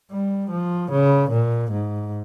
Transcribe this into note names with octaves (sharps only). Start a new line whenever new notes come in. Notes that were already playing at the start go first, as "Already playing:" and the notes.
G3
F3
C#3
A#2
G#2